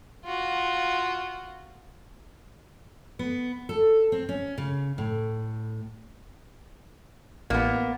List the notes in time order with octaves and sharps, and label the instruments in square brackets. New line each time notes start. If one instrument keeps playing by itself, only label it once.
[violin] F4 F#4
[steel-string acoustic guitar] B3
A4
C4
C#4
C#3
A2
[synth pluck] A1 [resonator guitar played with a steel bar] A#3 B3